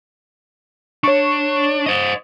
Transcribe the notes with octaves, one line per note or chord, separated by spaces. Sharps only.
D4 C#5 C#6
C5 D#5